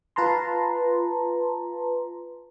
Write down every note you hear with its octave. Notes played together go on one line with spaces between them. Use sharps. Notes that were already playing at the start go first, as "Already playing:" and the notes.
F4 B4 A5 A#5 C6